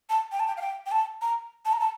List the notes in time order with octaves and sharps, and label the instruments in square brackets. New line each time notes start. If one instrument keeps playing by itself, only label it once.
[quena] A5
G5
A5
G5
F5
G5
G5
A5
A#5
A5
A#5
A5